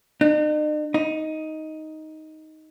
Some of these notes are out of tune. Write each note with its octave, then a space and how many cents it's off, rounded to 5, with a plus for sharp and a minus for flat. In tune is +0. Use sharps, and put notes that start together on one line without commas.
D#4 -45
D#4 +10